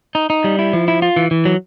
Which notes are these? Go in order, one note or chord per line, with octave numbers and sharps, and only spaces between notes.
D#4
D#4
G3
E4
F3
E4
F4
E3
E3
F#3